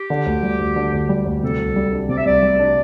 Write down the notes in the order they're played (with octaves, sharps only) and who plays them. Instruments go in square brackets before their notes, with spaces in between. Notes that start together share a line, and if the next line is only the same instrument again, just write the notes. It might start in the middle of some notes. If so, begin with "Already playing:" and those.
Already playing: [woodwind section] G4
[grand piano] D3
D2
G3
D2
D3
D2
G3
D2
[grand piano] C3 [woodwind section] A4
[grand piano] C2
G3
D4
[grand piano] C3 [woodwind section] D5
[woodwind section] E5
[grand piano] C2 [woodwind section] D5
[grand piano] G3
D4